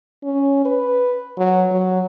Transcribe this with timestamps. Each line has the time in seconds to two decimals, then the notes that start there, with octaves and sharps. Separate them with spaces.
0.23 C#4
0.65 B4
1.38 F#3
1.71 F#3